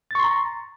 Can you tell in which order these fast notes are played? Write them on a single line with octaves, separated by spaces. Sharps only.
A6 C#6 C6 A#5